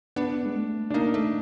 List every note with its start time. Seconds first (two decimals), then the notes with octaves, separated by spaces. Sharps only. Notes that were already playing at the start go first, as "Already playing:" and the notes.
0.16 B3 D4
0.46 G#3
0.56 A3
0.90 D4
0.94 A#3 D#4
1.14 A3